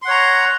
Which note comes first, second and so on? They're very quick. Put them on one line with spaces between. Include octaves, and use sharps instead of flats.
C6 F#5 C#5 A#5